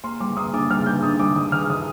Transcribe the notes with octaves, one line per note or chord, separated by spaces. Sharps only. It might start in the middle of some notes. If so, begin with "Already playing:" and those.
A#3 C6
G3 D6
A#3 D#6
D4 D6
G3 F6
G3 G6
D4 D#6
G3 D6
D#3 D#6
D#3 F6
D#3 D#6